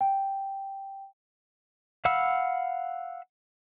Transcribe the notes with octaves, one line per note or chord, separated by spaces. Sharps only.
G5
F5 F#5 B5 E6